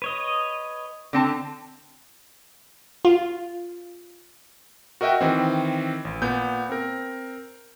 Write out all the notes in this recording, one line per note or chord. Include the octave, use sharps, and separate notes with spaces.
B4 C#5 D#5
D3 C4 A5
F4
F#4 A#4 D#5 E5 F#5 G5
D#3 E3 C4
A1
A#2 B3 G6
C4 A#4